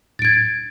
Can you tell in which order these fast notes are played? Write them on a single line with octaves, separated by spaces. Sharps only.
A6 D7 G#6